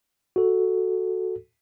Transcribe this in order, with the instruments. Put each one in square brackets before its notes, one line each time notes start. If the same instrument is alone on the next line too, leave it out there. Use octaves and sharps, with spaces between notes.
[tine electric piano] F#4 A4